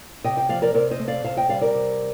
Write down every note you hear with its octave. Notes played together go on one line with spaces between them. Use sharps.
C3 D#5 G5
D#5 G5
F3 D5 F5
A#4 D5
C3 A#4 D5
C5 D#5
A3
D5 F5
C3 F5 A5
D#5 G5
G3 D5 F5
A#4 D5
C3